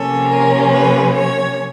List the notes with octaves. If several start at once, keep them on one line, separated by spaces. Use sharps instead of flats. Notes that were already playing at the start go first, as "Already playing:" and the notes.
Already playing: C3 F3 A#3 C#4 A4
A#4
B4
C#5